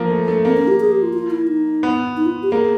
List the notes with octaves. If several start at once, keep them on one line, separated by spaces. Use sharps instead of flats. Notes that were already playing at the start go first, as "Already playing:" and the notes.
Already playing: F3 A#3
A3
A3
A#3 C4
C#4
G4
G#4
G4
F4
F4
E4
D#4
B3
D#4
F4
G4
A#3 G#4